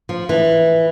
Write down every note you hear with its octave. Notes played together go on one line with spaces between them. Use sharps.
F3
E3